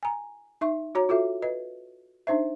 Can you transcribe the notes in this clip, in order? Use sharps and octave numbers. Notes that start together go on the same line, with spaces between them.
G#5 A#5
D#4 E5 C#6
F#4 C#5 A#5
F4 F#4 A4 E5
B4 D#5
D4 D#4 C5 E5